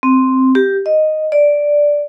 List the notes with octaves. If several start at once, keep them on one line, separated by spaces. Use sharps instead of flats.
C4
G4
D#5
D5